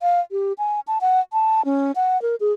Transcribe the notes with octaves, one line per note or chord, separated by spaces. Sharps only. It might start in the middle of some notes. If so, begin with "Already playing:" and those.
F5
G4
G#5
A5
F#5
A5
C#4
F#5
A#4
G#4